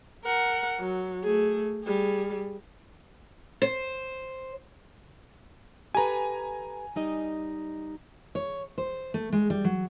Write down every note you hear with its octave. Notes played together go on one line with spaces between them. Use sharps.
A#4 F#5
F#3
A3 G#4
G3 G#4
C5
G4 A4 B4 G#5 A#5
G3 D#4 D#5
C#5
C5
A3
G#3
G3
F#3